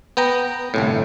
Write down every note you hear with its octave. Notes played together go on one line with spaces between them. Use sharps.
B3 G5 A#5
G1 C2 A2